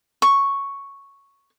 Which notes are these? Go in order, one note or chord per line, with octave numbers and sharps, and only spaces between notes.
C#6